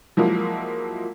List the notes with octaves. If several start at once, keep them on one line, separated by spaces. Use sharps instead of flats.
F3 F#3 G#3 A#3 E4